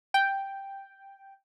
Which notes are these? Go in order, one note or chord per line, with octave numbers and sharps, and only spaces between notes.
G5